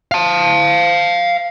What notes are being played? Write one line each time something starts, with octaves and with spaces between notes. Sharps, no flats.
F5 A5